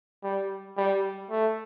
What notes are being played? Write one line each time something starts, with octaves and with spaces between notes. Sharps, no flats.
G3
G3
A3